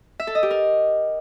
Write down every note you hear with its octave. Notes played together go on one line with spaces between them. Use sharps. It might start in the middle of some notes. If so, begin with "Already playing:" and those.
E5
A4
D#5
G4
A#4